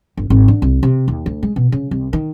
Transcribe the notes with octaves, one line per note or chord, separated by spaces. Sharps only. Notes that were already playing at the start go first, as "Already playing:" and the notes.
G1
G#1
D3
C2
C3
D#2
D2
G#3
B2
C#3
C2
D#3